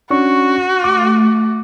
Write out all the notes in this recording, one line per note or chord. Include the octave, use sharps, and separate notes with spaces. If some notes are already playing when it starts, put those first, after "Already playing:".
C#4 D4 F#4 C#6
A3 D6